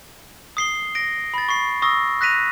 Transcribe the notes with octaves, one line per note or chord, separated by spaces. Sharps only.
D#6 C7 G7
A#6 D7
B5 A6
C#6 C7
C#6 D#6 E6 A#6
F#6 A#6 B6 D#7 F7